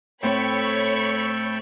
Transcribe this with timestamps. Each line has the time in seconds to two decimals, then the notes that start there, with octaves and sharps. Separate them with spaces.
0.23 A2 A3 C4 C#5 G5 B5 C#6 E6